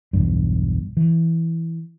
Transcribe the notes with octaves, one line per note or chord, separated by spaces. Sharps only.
B1 E2 G2
E3